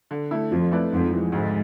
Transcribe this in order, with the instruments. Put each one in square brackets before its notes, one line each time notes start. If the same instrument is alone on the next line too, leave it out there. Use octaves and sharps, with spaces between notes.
[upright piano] D3
A3 E4 A4
[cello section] F2 [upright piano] F3
[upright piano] A3 E4 B4 D5
[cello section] F2 [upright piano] G#2
[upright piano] E3 G#3
[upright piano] D2 [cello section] G#2